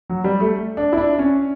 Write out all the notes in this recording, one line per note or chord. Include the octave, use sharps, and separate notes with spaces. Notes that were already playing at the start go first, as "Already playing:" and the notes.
F#3
G3
A3
D4
E4
D4
C#4